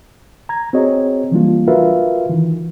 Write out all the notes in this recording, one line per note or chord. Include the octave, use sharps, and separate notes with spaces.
A#5 G#6
C4 F#4 G#4 C#5 D#5
E3 F#3 G3 A#3 D4 F4
F4 F#4 A#4 B4 E5 F5
D#3 E3